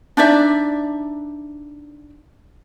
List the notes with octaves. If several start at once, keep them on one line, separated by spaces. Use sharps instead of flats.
D4 D#4 D5 E5